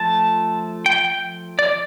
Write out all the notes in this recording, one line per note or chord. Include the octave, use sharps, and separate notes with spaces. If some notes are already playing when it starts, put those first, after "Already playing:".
Already playing: F3 A3 A5
G5
G5
D5